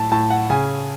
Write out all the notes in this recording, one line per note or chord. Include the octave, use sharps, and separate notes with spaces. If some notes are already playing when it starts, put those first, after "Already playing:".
Already playing: A2 A5
A2 A5
F#5
C#3 G#5